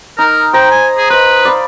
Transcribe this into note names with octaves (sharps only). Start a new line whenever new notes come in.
D#4 A#4
C5 G5 A#5
G#5
G#4
B4 C5 D#5
D5 F5 B5